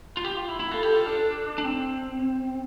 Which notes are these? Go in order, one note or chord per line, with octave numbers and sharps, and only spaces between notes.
F4
G4
F4
E4
E4
F4 A4
G4
F4
D4
D4
C4